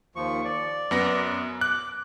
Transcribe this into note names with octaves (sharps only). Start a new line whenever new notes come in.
D#2 F3 C#6
D5
F#2 B3 A#6
D6 F#6